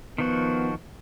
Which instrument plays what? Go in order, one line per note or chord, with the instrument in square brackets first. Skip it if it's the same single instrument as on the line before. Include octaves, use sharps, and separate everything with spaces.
[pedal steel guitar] D#3 F3 F#4 [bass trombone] B3